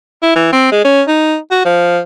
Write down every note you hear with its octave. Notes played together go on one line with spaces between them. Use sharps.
E4
E3
C4
G#3
C#4
D#4
F#4
F3